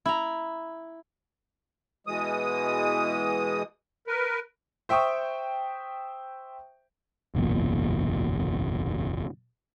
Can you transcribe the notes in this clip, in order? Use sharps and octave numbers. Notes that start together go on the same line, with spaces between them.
E4 A#5
B2 E3 G#3 D#6
A#4 B4
C5 E5 G5 C#6 D#6
F#1 B1 E2 A#2